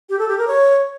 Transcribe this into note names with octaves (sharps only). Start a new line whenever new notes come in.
G4
A4
G4
A#4
C#5